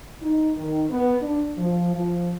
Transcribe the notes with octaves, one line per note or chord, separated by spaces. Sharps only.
D#4
D#3
B3
D4
F3
F3